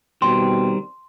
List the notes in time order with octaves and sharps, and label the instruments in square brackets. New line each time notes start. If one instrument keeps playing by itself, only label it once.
[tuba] B2 [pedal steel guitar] D#3 G3 C4 [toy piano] C6